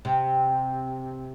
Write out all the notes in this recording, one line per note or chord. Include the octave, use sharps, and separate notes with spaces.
C3